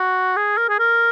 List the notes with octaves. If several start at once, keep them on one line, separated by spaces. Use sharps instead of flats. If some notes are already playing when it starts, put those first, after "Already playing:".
Already playing: F#4
G#4
A#4
G#4
A#4